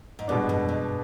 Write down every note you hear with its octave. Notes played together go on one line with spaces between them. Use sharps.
G#2
G2 B2 G#3 B3 D4
F2
G2